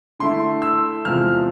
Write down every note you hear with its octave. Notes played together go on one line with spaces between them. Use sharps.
D3 A3 E4 C6
E6
E2 C3 F3 G#3 F6